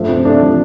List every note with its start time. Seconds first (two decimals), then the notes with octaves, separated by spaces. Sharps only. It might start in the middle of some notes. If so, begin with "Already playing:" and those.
Already playing: G2 F3 A3
0.08 C3
0.25 A3 D4
0.42 F3